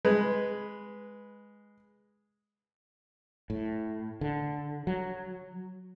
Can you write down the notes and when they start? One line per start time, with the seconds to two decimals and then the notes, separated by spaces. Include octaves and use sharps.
0.05 G#3 B4
3.50 A2
4.21 D3
4.87 F#3